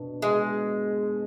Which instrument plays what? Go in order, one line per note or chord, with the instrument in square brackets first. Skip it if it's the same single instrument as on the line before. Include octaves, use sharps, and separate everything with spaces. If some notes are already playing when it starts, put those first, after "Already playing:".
Already playing: [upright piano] B2 D4
[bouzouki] G#3